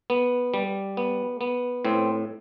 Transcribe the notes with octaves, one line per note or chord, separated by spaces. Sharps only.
B3
G3
B3
B3
A2 C4